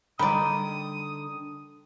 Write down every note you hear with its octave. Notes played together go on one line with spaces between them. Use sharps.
D3 D#3 G3 D5 B5 D#6